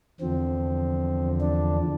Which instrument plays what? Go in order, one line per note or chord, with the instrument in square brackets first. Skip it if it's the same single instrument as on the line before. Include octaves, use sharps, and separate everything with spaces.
[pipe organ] E2 D3 F3 C4
D4